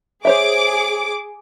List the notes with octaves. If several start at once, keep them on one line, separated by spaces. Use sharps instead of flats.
G#4 C5 C#5 E5 D6